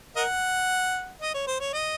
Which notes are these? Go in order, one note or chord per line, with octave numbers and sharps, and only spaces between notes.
A#4 D#5 F#5
D#5
C#5
C5
C#5
D#5